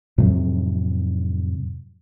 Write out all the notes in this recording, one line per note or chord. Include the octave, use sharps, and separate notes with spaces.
F2 A2 C3 F#3